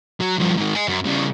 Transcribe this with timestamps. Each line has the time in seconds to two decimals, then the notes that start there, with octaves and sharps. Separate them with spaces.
0.20 F#3
0.38 G2 F3
0.57 G#2 D#3
0.75 D#5 G#5
0.88 F#2
1.06 C#3 G3